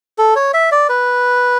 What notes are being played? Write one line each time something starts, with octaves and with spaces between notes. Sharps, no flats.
A4
C#5
E5
D5
B4